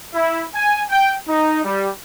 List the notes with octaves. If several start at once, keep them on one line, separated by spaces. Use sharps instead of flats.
E4
G#5
G5
D#4
G3